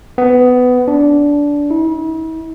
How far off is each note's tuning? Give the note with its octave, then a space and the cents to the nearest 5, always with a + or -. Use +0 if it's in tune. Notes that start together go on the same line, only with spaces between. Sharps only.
B3 +15
D4 -15
E4 -45